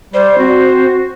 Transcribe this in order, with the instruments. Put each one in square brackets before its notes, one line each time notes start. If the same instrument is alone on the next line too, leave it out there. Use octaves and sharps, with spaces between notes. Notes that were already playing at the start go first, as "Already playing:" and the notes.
[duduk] G3 [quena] C5 [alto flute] D5
[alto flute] C4 [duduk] F#4